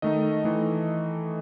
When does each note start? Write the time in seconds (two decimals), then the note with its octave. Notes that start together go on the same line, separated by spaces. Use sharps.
0.02 D#3 A3 D#4 D#5
0.44 E3 A3 D#4